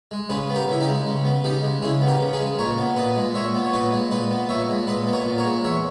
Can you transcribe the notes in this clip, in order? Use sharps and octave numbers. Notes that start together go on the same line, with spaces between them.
G#3
C#3 G#4 B4
B3
G4 A#4
C#3 E4
D#4 G4
G#3
C#3
B3
C#3 D#4 G4
G#3
C#3 E4 G#4
B3
G4 A#4
C#3
G#4 B4
G#3
A#2 A#4 C#5
B3
A#2 B4 D#5
G#3
A#2 C#5 E5
B3
C#5
A#2 B4 D#5
G#3
A#2 B4 D#5
B3
A#2 C#5 E5
G#3
A#2 B4 D#5
B3
A#4 C#5
A#2
A#4 C#5
G#3
E2 C#5 E5